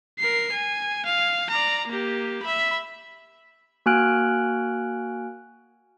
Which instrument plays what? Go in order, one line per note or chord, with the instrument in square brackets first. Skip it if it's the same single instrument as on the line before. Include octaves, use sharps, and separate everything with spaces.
[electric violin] A#4 C7
G#5
F5
D5 A#5
A#3 G4
E5 B5
[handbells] A#3 F#4 G#5 F6 F#6 D7